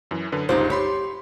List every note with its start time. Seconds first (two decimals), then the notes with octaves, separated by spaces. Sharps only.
0.11 F#2 E3
0.32 F#2 D3 B4
0.49 G1 C#2 D#4 F4 G4 C5
0.70 G4 C#5 B5 C6